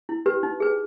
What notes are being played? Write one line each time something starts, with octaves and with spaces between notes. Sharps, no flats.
E4
G4 B4
D#4
G#4 B4